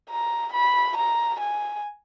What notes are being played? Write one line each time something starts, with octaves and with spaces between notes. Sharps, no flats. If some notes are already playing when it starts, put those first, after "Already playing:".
A#5
B5
A#5
G#5